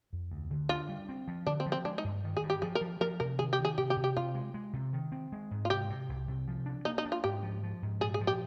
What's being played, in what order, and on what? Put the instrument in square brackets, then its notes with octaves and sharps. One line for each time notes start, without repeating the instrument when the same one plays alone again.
[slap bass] F2
D2
D3
[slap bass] D4 [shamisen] F4
[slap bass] G3
C4
F3
[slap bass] D3 [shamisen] D4
[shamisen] C4
[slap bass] F3
[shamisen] C4
[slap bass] G#3 [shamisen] D4
[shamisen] D#4
[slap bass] G2
D#3
[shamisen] G#4
[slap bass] G2
[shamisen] G4
[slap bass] F3 [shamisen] G#4
[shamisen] A#4
[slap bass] F3
[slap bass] F3 [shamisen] A#4
[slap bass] C3 [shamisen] A#4
[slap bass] D#3 [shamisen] G#4
[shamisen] G4
[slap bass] D#3
[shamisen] G#4
[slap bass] C3 [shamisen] G4
[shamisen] G4
[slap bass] C3
[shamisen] G4
[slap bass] C3 [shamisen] F4
[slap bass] G#3
G#3
C3
D#3
C4
G#3
G#2
[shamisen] F4
[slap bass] C3 [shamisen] G4
[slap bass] C3
C2
C3
F3
D4
[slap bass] A#3 [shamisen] D#4
[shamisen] D#4
[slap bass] D4
[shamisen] F4
[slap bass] G#2 [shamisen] G4
[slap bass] F3
F3
G#2
[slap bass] A#2 [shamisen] G#4
[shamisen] G#4
[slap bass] F3
[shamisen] G4